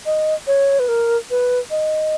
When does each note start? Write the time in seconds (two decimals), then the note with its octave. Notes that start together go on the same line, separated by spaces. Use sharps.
0.06 D#5
0.47 C#5
0.79 B4
0.88 A#4
1.31 B4
1.71 D#5